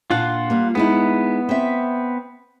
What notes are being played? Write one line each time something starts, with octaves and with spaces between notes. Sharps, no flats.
A#2 D4 F4 F5 F#5
G3 A#3
G#3 B3 D#4 E4
C4 E5